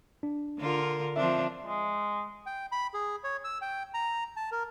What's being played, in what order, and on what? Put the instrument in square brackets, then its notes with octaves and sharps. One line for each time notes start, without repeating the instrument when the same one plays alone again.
[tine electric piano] D4
[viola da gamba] D3 F4 A#4
[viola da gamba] F3 C4 D4 [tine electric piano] E5
[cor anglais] G#3
[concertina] G5
B5
G#4
C#5
E6
G5
A#5
A5
A#4